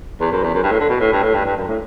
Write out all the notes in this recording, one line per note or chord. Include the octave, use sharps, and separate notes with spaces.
E2
F#2
E2
F#2
G2
A2
D3
B2
A2
G2
A2
G2
G2
F#2
A2